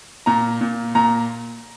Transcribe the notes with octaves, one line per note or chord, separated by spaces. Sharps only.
A#2 A#5
A#2
A#2 A#5